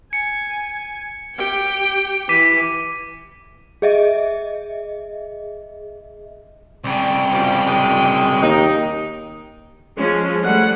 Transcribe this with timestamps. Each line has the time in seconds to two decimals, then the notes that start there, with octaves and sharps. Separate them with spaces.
0.13 G#5 C#7
1.35 G4 G5
2.29 E3 D6 B6 D#7
3.82 G#4 D#5 E5
6.84 C2 C#3 D5 G5
7.33 B2 F3 G3
7.65 F#2 E3 G#3
8.43 D#2 D#4
9.98 F3 G#3 C#4
10.43 G3 A3 G#4 F#5